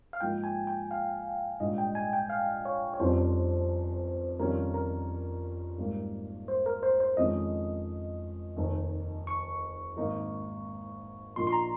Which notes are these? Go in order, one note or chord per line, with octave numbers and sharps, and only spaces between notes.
F5
G#2 F3 A#3 D#4 G5
G#5
G5
F5
A#1 G#2 G3 D#5
G5
G#5
G5
F5
C#5
C#5
F1 F2 C3 G3 C#4 C5
F2 D#3 G3 C#4 F4 A#4
A#4
G#1 G#2 G3 A#3
C5
A#4
C5
C5
F2 D#3 G#3 C#4 D#5
F1 D#2 D#3
C#6
G#1 G#2 D#3 A#3 D#4
A#1 A#2 F3 A#3 D#4 C6
C6
A#5